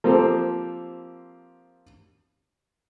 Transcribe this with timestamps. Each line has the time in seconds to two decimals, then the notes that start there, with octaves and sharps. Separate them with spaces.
0.04 F3 A#3 C4 G4 A4 C5